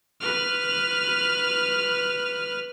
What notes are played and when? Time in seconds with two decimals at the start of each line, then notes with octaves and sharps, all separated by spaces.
0.21 B4 F6